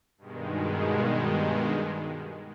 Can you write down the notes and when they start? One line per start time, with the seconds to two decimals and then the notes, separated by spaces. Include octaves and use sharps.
0.18 G2 B2 D#3 G#3